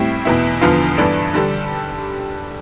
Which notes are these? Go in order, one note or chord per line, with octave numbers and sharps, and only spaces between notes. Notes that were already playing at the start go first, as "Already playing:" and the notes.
Already playing: A2 G3 C4 E4
E2 B2 B3 E4
E2 D3 F3 B3 F4
G2 E3 B3 D4 A4
D3 G3 D4 A4